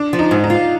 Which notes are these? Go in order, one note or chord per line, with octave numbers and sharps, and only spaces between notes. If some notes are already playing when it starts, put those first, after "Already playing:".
Already playing: D4
F3
D#4
G#2
D#4
F4